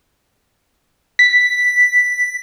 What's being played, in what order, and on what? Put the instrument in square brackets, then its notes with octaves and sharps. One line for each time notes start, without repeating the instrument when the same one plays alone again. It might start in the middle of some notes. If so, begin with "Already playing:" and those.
[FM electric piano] B6